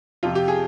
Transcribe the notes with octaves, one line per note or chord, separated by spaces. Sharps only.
F2 C3 F3 F4
G4
G#4